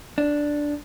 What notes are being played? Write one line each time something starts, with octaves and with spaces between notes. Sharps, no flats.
D4